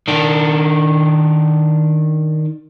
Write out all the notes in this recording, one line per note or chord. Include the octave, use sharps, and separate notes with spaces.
D#3 D4